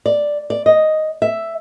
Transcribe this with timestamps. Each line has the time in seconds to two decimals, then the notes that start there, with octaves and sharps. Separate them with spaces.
0.06 D5
0.50 D5
0.66 D#5
1.22 E5